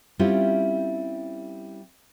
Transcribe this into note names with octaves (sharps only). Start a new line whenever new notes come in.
G3 C4 C#4 E4 F4 G4